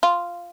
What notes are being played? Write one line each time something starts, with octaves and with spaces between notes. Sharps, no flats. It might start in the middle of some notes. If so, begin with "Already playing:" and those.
F4